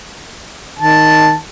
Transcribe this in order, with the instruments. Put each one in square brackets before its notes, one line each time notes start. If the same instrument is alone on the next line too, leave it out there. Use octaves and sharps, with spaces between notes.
[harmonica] D#3 A5